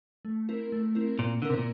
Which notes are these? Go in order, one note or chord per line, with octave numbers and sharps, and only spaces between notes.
A3
C4 E4 A#4
A3
C4 E4 A#4
A#2 C4
D3 E4 A#4
C3
A#2